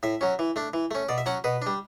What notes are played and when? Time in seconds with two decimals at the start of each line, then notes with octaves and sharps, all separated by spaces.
0.03 A2 E5
0.21 F#3 C#4
0.39 E3
0.56 A3 D4
0.74 E3
0.91 A3 C#4
1.09 B2 D5
1.18 E5
1.26 F#3 C#4 F#5
1.44 B2 B4
1.62 G3 D4